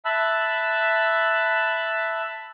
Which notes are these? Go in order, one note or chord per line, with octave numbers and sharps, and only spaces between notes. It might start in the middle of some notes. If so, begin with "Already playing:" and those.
E5 A5 B5 E6 F#6